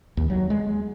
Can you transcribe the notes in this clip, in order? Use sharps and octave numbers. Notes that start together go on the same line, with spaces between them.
D#2
F#3
G#3